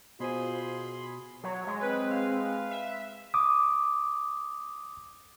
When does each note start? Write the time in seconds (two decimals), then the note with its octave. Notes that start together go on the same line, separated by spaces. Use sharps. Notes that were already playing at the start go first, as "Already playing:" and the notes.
0.20 B2 F4 G#4 C5 G#5 B5 C6
1.44 F#3 C#5
1.67 G#3
1.82 C4 B4
2.11 B4 F5
2.71 E5
3.34 D6 D#6